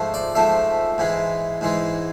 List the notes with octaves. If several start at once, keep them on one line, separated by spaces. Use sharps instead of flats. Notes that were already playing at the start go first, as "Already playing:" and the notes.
Already playing: G#2 F3 A3
D5
G#2 F3 A3 E5
G#2 E3 G#3
G#2 E3 G#3